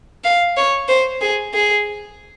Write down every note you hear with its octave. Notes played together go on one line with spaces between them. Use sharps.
F5
C#5
C5
G#4
G#4